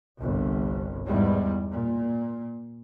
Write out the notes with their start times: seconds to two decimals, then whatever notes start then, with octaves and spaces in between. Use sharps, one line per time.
0.18 G1 C2
1.07 E2 G#2 G3
1.71 A#2